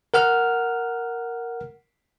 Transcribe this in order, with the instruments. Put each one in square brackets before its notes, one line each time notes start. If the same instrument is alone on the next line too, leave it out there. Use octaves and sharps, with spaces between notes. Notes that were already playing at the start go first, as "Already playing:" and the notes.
[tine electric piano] A#4 F#5 F6